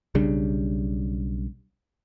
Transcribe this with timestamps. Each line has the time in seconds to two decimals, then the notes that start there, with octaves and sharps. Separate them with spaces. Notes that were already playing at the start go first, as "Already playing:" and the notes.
0.15 B1 C#3 G3 D4